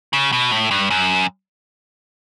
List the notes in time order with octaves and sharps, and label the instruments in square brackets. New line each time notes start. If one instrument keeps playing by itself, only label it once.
[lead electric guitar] C#3
B2
A2
G2
F#2